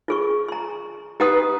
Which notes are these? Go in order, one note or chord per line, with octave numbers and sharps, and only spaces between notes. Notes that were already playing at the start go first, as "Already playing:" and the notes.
F4 G#4 C#6
A#5 C6
D#4 G4 B4 F#5 D#6